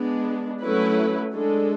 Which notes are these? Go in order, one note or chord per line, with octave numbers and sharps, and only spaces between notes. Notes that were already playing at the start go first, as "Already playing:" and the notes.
Already playing: G#3 B3 D4
F#3 A3 C#4 E4 B4
G#3 D4 A4